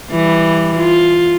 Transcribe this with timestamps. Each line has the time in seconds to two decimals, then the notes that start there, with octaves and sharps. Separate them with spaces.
0.11 E3 G3
0.78 F4